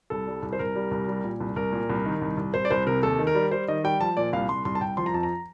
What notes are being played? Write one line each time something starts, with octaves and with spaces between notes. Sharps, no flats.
C2 A4
G3
C2
C5
C2 A#4
G3
C2
G3
A#2
C2
C2 A#4
A#2
C2
D#3
C2
C2
C2 C5
D5
C2 C5
C3 A#4
D#2 A4
D#3
A#4
G3
G3 C5
D#3 D#5
G3 G5
F3 A5
A#2 D5
C2 F5
C2 C6
C2 C6
A5
C2 G5
F3 C6
A#5
F2 A5
A#5